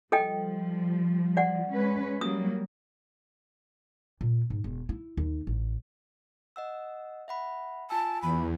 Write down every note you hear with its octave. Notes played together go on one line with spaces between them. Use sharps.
F3 G3 A4 D#5 G5
D5 F#5
G#3 C#4 B4
F#3 G3 A#3 D#6
A#2
G#2
E1
E4
D#2
A1
D#5 F#5 E6
E5 F#5 B5
F4 G#5 A5 E6
E2 B5